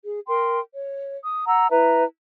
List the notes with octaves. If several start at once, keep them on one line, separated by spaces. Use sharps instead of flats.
G#4
A#4 G5 C6
C#5
D#6
F#5 A#5 E6
E4 B4 E5 A#5